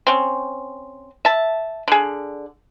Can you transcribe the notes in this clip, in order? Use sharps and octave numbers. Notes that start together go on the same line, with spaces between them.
C4 C#4
E5 A5
D3 G#4